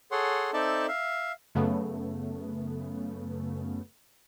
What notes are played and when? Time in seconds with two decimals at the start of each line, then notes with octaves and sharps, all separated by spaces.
0.12 G#4 A4 C#5 F#5 C6
0.53 C4 D#4 A4 D5 E5 A5
0.88 E5 F5
1.55 F#2 C#3 A3 B3